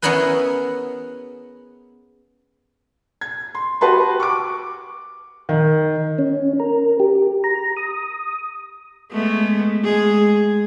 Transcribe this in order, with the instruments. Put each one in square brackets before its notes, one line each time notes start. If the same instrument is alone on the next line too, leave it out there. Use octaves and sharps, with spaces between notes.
[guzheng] B3 C#4 E4 G#4 A#4 B4
[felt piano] G#6
C6
F#4 G4 B4 A5 C6
C#6 D6
D#3
[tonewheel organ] C#4
A#4
G4
A#5
D#6
[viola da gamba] G#3 A3 B3
G#3 G#4